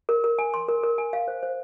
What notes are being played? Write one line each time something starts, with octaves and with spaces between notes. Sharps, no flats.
A#4
A#4
G#5
C6
A#4
A#4
G#5
F5
C5
C5